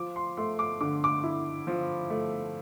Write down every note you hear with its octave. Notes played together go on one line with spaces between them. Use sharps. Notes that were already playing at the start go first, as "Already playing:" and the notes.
Already playing: F3 D6
C6
A3 C6
D6
D3 D6
D6
E4
F3
A3